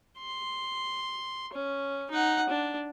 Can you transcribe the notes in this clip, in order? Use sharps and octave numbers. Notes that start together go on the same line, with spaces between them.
C6
C#4
D#4 F#5
D4